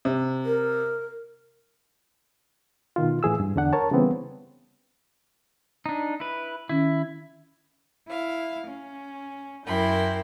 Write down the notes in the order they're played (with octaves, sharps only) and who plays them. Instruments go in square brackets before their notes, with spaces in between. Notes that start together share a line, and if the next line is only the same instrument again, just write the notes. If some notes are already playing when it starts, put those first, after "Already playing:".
[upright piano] C3
[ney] A#4
[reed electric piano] B2 D#3 F4
A2 E3 G#4 E6
G2
E2 D3 D4 F#5
A#4 C#5 A5
C#3 E3 G3 B3 C4
[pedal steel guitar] D4 D#4
E4 B4
[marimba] D#3 C#4 [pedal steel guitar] E4
[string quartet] E4 F5
C#4
F#2 E4 A#4 G5 B5 C6